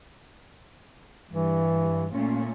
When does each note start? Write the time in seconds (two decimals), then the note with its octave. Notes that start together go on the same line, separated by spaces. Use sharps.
1.31 G2 E3
2.13 A#2 A3 C#4